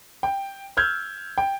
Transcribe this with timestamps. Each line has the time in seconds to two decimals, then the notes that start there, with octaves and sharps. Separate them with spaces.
0.23 G5
0.77 E6 F6 G6 G#6
1.38 G5